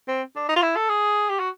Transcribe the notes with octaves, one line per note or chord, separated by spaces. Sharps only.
C4
D4
D#4
F4
E4
A4
G#4
G4
F#4